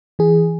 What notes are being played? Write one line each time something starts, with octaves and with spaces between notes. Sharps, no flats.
E3 G#4